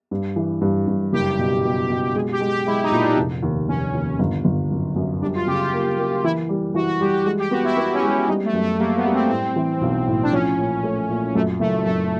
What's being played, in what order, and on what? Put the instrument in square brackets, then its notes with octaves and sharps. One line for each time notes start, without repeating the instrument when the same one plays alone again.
[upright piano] G2
E3
G2
G2
[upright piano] F#1 [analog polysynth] G4
[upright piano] B2
B2
B2
[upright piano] G#3 [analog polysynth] G#4
[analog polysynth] G4
[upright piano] G#3
[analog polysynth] G4
[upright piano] G#3 [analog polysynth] E4
[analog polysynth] D#4
[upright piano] A#2
[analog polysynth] D4
[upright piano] F1
D#2
[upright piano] F1 [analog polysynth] C#4
[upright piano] D#2
G1
G1
F#2
F#2
[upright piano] G3 [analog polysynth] D4
[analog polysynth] F4
[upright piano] C#3 [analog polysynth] G4
[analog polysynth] F4
[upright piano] A#3
A#3
[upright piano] E3 [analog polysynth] E4
[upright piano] G3
[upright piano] E3 [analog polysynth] F#4
[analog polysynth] F#4
[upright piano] G3 [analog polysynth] G4
[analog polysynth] G4
[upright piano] G#3 [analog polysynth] F#4
[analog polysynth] G4
[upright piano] B3 [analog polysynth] F#4
[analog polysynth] E4
[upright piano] B3 [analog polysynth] E4
[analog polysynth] C#4
[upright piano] G#3
[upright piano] G3 [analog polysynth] D#4
[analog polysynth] A3
[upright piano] F#2
[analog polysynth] A3
[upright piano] G3 [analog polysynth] A#3
[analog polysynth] B3
[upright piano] G3
[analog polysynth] C4
[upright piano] A2 [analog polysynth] C4
[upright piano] E3
B1
A2
[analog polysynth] D4
[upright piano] F3 [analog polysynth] C#4
[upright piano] A#2
A3
A#2
[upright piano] F#2 [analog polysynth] A3
[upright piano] F#1 [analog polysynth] A3
[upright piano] F#2 [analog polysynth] A3